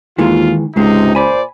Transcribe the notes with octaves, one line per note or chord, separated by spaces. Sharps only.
D#2 D#3 E3 G#3 F4
C#2 G#2 C3 G#3 D#4
A#2 C5 D5 G#5 B5